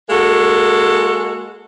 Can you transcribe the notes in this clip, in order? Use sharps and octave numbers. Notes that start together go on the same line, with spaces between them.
G#3 A#3 F#4 A4